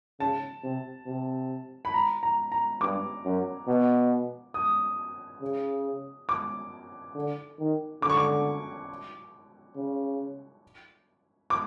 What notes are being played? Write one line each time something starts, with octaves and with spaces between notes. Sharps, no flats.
C#3 A5
C3
C3
B5
A#5
A#5
A#5
G2 D6
F#2
B2
D#6
C#3
D6
D3
D#3
D3 D6
C#6
D6
C#3
D6